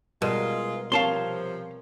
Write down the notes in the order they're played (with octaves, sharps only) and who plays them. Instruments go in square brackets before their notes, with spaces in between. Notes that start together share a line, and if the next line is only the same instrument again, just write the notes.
[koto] B2 [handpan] G3 A#4 [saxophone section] G#3 F4
[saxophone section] C3 F3 [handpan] C4 A#4 C#5 [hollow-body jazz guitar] F5 A5 C6